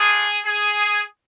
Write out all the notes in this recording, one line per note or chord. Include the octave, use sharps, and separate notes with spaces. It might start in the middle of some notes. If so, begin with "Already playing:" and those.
Already playing: A3 D4 F4 G#4
G#4